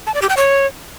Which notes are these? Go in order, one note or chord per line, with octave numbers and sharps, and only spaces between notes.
A5
D5
G4
G5
C#5